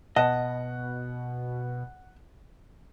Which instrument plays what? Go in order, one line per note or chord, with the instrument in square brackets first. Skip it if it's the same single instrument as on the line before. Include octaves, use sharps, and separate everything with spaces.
[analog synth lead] B2 [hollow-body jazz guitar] D#5 [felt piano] F#5 [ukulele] A5